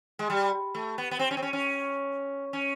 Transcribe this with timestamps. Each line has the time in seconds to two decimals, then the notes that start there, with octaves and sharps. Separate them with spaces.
0.19 G#3
0.30 G3
0.75 A3
0.98 B3
1.11 B3
1.19 C4
1.31 C#4
1.37 C4
1.43 C#4
1.53 C#4
2.53 C#4